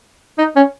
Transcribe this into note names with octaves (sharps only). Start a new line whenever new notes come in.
D#4
C#4